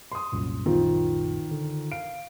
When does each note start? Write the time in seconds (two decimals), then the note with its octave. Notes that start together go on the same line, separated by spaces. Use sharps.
0.12 C6 D#6
0.32 C2 F#2 A#2
0.66 D#3 F3 F4
1.51 D3
1.92 F5 D7